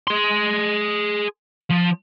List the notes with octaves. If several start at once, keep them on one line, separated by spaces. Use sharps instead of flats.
G#4 C6
F3